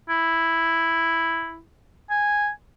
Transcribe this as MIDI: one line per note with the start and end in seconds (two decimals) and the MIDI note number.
0.09 1.59 64
2.10 2.49 80